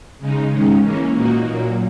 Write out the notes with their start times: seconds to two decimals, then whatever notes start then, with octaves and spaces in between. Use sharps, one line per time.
0.19 C#3 G#3 D#4
0.51 G#2 D#3 G#3 C#4
0.82 E3 A#3 C#4
1.14 A#2 A#3 D#4 F#4
1.46 A#2 F#3 A#3